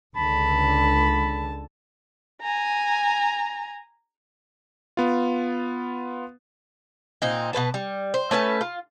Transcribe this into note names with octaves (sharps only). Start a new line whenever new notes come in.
C#2 D3 A5 B5
G#5 A#5
B3 F4
A#2 C4 D#4
B2 C#4 B4 A5
G3
C5
A3 C#4 B4 A5
F4